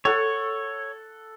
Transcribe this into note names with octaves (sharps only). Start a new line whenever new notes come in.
A4 C#5 F#5